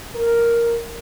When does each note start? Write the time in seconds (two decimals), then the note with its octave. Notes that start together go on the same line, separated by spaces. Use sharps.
0.16 A#4